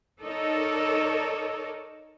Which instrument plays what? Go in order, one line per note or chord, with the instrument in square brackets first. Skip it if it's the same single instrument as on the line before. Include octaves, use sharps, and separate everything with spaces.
[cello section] D#4 A4 A#4 C#5 D5